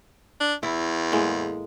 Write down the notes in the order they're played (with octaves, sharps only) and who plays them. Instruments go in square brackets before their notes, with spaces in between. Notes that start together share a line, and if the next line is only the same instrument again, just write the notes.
[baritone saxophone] D4
[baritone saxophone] E2 [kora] E4
[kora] A2 G#3 A#3